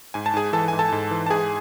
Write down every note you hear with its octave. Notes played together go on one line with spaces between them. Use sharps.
G#2 G#5
A5
G#2 G#4 G#5
E3 A4 A5
G#2 G#5
A4 A5
G#2
E3
A5
G#2 G#4 G#5